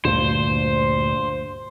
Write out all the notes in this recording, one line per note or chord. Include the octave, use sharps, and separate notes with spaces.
D2 G2 A#2 C5